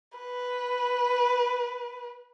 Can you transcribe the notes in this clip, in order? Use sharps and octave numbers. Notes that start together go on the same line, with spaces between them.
B4